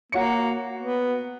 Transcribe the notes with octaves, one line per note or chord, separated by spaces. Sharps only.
A#3 F#4 C#5 C#7
B3